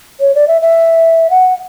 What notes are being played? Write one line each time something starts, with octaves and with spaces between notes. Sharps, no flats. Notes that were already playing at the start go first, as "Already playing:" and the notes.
C#5
D5
E5
E5
F#5